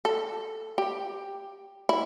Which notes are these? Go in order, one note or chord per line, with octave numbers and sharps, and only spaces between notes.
A4
G4
E4